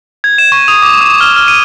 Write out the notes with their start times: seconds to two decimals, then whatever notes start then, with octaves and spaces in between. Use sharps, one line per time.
0.24 G#6
0.38 E7
0.52 C#6
0.68 D#6
0.82 D6
1.01 D#6
1.21 F6
1.36 F6
1.48 D#7